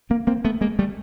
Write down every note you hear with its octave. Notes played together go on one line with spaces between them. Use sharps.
A#3 C4
A#3 C4
A3 B3
G#3 A#3
G3 A3